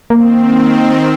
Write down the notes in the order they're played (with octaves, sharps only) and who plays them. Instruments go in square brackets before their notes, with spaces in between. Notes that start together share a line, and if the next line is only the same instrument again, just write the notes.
[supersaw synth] D#3 C4 [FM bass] A#3